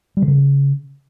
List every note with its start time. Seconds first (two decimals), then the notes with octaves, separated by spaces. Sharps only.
0.17 G3
0.22 D3
0.28 C#3